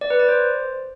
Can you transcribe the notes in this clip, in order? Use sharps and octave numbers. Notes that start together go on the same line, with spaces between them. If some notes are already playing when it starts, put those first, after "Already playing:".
D5
B4
D5
C5